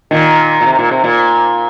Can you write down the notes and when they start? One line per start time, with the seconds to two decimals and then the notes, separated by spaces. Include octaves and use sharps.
0.11 A#2 D#3
0.61 A#2
0.66 C3
0.79 A#2
0.91 C3
1.04 A#2